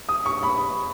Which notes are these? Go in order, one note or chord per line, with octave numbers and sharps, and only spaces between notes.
D#6
C#6
B5